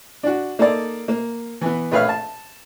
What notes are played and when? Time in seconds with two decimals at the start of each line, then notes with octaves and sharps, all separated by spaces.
0.23 D4 F#4
0.59 A#3 D#4 A4 D5
1.08 A#3
1.61 E3 B3
1.92 A#1 A3 B4 C#5 F5 F6
2.09 A5